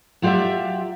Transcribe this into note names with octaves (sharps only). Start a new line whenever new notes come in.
F#3 F4 G4 C5 D5 E5